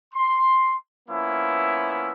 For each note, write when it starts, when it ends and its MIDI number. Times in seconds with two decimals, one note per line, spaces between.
0.14 0.74 84
1.09 2.12 53
1.09 2.12 58
1.09 2.12 59
1.09 2.12 61
1.09 2.12 64